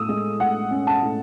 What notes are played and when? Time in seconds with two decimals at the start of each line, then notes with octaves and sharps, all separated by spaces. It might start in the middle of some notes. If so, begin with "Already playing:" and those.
Already playing: A2 D#6 E6
0.09 G#3
0.40 A2 F#5
0.71 C#4
0.87 A5
1.03 A2